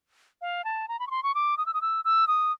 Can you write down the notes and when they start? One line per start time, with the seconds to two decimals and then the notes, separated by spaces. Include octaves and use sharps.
0.41 F5
0.64 A5
0.88 A#5
0.99 B5
1.07 C#6
1.11 C6
1.23 C#6
1.35 D6
1.57 D#6
1.66 E6
1.74 D#6
1.81 E6
2.05 E6
2.27 D#6